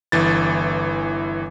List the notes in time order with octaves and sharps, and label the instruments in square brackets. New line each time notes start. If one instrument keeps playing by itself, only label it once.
[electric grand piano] G1 E3 A6